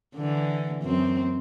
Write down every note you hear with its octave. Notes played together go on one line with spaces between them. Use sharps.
D3 E3
F#2 C4